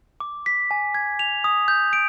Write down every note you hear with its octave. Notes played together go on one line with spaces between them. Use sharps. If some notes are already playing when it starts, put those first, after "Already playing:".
D6
B6
G#5
G#6
F7
D#6
G6
D7